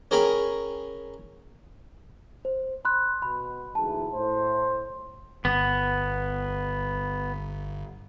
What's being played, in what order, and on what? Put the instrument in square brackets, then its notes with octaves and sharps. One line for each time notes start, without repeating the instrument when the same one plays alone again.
[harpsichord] C#4 G#4 A#4 G5 A#5 B5
[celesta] C5
B5 C6 F#6
[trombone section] B2 [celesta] B5
[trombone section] D2 G#2 E3 [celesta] A5
[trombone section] A2 C5
[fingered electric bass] G1 [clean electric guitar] B3